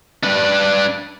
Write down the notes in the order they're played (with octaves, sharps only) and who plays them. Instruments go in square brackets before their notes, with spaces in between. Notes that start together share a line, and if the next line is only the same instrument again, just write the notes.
[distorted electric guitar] D4 B4